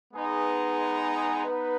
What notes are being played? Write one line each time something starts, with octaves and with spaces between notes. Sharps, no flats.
G#3 B3 D#4 G#4 B4
B3 D#4 B4